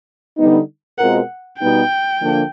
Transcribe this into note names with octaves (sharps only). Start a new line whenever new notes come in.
D3 G3 B3 D#4
B2 G#3 C4 F4 A#4 F#5
B2 G3 B3 D#4 G5
D3 F3 A#3 D4